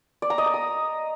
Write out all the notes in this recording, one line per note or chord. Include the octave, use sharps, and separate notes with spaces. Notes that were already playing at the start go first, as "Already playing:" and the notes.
D5
A#5
D#5
A#5
D#6